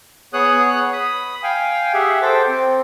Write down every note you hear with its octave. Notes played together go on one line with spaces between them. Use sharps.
B3 G#4 C#5 D#6 F#6
B5 D#6
F5 G5 G#5
G4 G#4 E5 F#5
A4 C5 G5 D6
C4